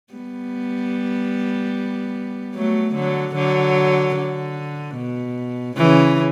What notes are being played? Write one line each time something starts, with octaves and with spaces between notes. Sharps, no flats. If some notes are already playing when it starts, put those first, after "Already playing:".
G3 B3
F#3 A3
D3 F#3
D3 F#3
D3
B2
C#3 E3